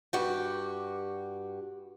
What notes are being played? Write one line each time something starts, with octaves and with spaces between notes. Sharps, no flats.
G2 F#4 G4